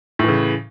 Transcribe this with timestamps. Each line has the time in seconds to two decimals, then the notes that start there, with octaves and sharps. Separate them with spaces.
0.19 A2
0.24 E3
0.28 C#3